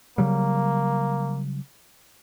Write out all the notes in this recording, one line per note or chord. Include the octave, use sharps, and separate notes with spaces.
C#3 F#3 G3 A#3